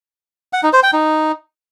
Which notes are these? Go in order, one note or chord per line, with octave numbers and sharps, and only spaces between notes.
F#5
D#4
C5
G5
D#4